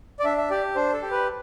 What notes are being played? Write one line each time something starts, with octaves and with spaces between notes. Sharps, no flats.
D5
D4 E5
E5
G4 D5
D4 C5
A4
G4
B4